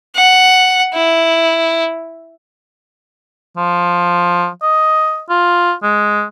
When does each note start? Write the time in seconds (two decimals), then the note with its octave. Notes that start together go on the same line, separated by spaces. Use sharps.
0.15 F#5
0.93 E4
3.57 F3
4.62 D#5
5.29 F4
5.83 G#3